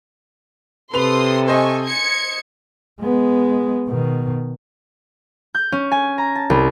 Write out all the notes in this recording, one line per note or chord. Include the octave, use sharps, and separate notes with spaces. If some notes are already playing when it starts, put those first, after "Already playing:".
C3 A4 B4 C6 D#6 F7
C5 D#5 G#5 C#6
G#6 C#7
G#3 B3
B2 D#3
G6
C#4
G#5
A#5
A5
C2